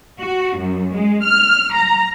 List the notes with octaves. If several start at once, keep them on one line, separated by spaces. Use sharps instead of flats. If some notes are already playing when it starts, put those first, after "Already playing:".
F#4
F#2
G#3
F6
A#5